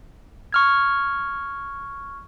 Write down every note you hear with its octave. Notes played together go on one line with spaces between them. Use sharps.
C#6 F6 G#6